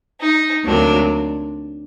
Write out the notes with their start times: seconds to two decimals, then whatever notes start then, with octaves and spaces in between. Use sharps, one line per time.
0.20 D#4
0.64 D2 C3 F#3 A#3 D4